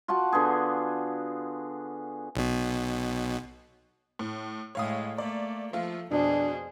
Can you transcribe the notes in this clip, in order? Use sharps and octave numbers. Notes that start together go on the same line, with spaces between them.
F4 F#4 F#5 A5
D3 B3 G#4
B1 B2
A2
A2 G#3 C#5 F5 D#6
A3 A#3 D5
F3 A3 F4
F2 B2 D4 G#4 C5